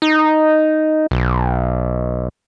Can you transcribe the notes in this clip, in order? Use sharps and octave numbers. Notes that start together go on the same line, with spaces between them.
D#4
B1